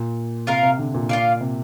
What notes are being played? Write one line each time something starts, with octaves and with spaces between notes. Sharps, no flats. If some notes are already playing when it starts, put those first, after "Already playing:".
Already playing: A#2
C3 F4 A#4 F5
C3
D3
A#2
F4 D5 F5
C3